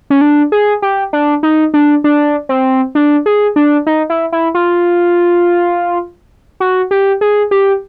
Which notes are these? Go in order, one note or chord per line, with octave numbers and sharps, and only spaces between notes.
C#4
D4
G#4
G4
D4
D#4
D4
D4
C4
D4
G#4
D4
D#4
E4
E4
F4
F#4
G4
G#4
G4